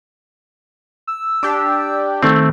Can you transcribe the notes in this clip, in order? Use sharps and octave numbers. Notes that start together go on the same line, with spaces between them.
E6
D4 G4
D#3 A3 C4